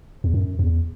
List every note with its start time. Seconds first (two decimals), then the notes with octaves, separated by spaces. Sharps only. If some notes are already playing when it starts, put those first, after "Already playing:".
0.24 E2
0.34 F#2
0.59 E2